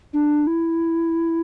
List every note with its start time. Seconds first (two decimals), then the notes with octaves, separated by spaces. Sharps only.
0.13 D4
0.47 E4